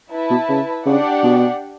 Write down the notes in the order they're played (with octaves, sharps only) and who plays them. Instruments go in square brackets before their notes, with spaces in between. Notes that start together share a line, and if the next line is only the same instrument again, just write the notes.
[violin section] E4 B4 E5 A5
[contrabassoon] B2
C#3
[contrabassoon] C#3 [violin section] D4 G4 D5 F#5
[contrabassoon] B2